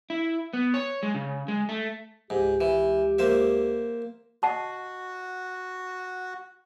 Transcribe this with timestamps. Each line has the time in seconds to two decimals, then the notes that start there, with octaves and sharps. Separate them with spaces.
0.10 E4
0.53 B3
0.74 C#5
1.03 G#3
1.14 C#3
1.48 G#3
1.69 A3
2.30 C#2 G#2 G4
2.61 E3
3.19 A#3 C5 E5
4.43 F#4 D#5 F#5 A5